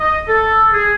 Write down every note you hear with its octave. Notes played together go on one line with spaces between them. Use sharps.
D#5
A4
G#4